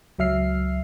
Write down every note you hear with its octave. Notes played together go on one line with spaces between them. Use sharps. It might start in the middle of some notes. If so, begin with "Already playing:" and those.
C#2 F#3 E5 F6 C7